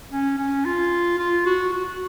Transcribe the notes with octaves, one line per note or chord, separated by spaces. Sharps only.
C#4
C#4
F4
F4
F#4
F#4